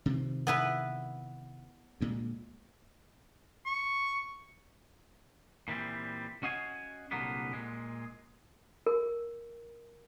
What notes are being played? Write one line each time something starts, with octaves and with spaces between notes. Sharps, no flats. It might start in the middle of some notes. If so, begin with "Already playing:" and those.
C3 D#3 F3
B3 E4 B4
D2 A#2 G#3
C#6
A#2 E3 G3 C4
C#4 F#4 D#5 F5 G#5
C2 A#2 D3 F#3 A#3 B3
A#2 G#3
A#4